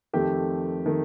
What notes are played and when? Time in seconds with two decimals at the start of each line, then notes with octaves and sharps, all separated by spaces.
0.13 F2 D#3 A3 G4
0.86 D#3 A3